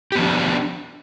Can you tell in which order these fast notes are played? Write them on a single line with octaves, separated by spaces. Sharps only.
G4 B3 F3 D4